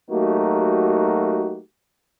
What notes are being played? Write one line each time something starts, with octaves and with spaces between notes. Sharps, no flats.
F#3 A3 A#3 D#4 F#4 G4